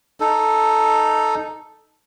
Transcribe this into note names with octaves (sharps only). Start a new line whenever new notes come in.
D#4 A4